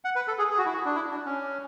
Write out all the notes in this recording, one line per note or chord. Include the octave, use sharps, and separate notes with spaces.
F#5
B4
A4
G#4
G#4
F#4
E4
F#4
D4
E4
D4
C#4